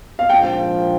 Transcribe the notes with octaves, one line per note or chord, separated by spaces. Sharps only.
F5
A#1 G#2 F3 G5